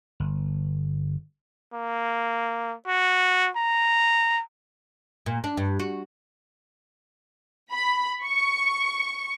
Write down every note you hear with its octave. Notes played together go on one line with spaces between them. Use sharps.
G1
A#3
F#4
A#5
A#2
D4
G2
F#4
B5
C#6